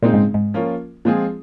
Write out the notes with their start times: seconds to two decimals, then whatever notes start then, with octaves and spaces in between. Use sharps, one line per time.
0.02 A#2 C#3 G#3 C4 D#4
0.14 G#2
0.34 G#2
0.54 F3 A#3 C#4 F4 A#4
1.05 A#2 F3 G#3 C4 F4 G#4